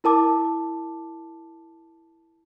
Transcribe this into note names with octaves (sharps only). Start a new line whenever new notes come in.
E4 A#4 A5 D6